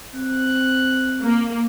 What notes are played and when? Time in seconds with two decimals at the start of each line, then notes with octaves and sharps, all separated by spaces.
0.14 C4 F#6
1.22 A#3